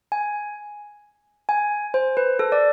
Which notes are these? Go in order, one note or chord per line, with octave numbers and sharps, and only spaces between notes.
G#5
G#5
C5
B4
A4
D5